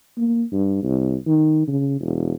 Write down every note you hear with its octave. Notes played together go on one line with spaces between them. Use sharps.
A#3
G2
C2
D#3
C#3
E1